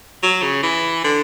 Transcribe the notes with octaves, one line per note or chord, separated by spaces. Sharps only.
F#3
C#3
E3
D3